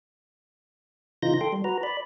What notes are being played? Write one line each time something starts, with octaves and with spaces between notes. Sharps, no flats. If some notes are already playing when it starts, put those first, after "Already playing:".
C#3 E3 D#4 F4 G6 A#6
A4 G5 C6
G3
F#4 B4 A#5
D5 B5